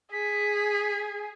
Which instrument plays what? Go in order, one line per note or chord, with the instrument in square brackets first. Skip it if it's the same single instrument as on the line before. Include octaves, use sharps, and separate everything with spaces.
[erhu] G#4 [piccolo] B6